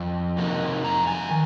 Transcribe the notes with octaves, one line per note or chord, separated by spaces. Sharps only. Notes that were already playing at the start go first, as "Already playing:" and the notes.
Already playing: F2
C3 F#3 A#3 D#4
F2 A#5
G#5
D#3